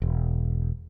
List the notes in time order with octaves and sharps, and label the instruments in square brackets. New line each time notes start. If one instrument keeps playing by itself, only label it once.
[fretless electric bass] E1